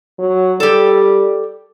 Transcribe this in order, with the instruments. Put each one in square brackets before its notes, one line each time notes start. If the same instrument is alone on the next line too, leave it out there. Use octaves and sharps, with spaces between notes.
[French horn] F#3
[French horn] G3 [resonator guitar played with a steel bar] G4 A4